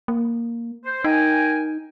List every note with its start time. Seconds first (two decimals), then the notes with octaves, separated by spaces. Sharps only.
0.08 A#3
0.85 C5
1.04 D#4 A#4 G5 G#5